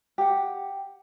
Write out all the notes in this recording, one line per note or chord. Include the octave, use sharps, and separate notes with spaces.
G4 F#5